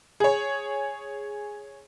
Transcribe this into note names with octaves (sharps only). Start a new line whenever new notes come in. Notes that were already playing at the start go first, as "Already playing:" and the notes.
G#4 C#5